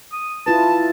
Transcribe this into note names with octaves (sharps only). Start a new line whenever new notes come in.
D#6
E4 F4 B4 A5